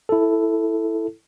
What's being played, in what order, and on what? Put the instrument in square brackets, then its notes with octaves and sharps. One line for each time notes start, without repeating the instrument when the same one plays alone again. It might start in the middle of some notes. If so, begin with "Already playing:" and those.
[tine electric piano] E4 A4